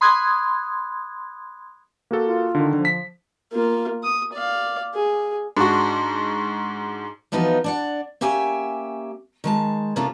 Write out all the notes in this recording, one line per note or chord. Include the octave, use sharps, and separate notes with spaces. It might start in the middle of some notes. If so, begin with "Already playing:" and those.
B5 C6 D#6 F#6 G#6
A#3 F#4 A4
F4
D3 D#3
D3 F3
B6
A#3 F4
D#6
D5 F5
G#4
G#2 D4 F#4
E3 F3 B3 D#4 F4 F#4
D4 D5 F#5
A#3 C#4 G4 E5 G5 G#5
D#3 G#3 A5
C3 A#3 C#4 D4 F4 A4